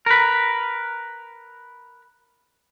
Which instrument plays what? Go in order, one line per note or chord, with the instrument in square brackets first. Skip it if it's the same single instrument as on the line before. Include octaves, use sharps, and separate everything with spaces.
[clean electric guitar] A#4 B4